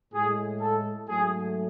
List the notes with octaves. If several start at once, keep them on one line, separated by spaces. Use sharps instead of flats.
A2 G#3 G#4
A4
G#2 F#3 A3 G#4